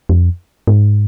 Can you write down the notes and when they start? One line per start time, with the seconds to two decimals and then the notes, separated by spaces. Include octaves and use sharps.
0.09 F2
0.67 G#2